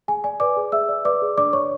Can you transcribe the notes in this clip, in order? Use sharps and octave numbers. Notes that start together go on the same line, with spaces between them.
G#4 G#5
D5 G#5
B4 D5 D6
G#4
G#4 E5 E6
D5
B4 D5 D6
G#4
D4 D5 D6
C#5 D5 C#6